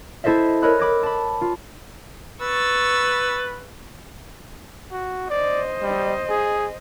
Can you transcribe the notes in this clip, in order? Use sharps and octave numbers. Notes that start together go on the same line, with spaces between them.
E4 A4 C5 D#5 E5
A#4 C#5 D#5 B5 E6 F#6
B5 D6 G#6 A#6
A5 B5
F4
B4 C#6 E6 A6
F#4
C5 D5 D#5
G3
G#4